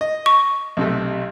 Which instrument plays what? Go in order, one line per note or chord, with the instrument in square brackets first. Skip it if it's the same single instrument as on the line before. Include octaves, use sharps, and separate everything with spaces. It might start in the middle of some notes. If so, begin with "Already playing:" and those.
[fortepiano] D#5
[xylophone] C#6
[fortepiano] B1 C3 A3